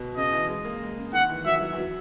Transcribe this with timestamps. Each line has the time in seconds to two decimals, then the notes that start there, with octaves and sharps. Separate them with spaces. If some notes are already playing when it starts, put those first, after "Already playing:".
Already playing: B2
0.16 C#3 D#5
0.33 E3
0.48 G#3
0.65 A#3
0.82 G#3
0.97 C#3
1.13 D#3 F#5
1.29 E3
1.46 F#3 E5
1.55 E3
1.62 F#3
1.73 E3
1.78 F#3